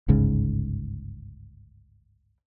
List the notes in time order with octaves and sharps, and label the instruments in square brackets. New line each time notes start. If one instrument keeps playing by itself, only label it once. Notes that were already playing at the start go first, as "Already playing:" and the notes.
[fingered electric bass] G1 C#2 G#2 C#3